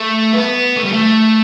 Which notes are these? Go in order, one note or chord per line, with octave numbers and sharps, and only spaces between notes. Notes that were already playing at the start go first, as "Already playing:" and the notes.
Already playing: A3
B3
A3
G3
A3